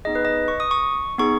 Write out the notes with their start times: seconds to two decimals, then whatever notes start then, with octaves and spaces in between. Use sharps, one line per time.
0.05 B3 D#4 G#4 D#5
0.15 B4
0.25 D#5
0.48 C#6
0.60 D#6
0.71 C#6
1.18 B3 D#4 G#4 C#6